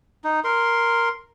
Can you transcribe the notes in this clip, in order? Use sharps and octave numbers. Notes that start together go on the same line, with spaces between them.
D#4
A#4 C6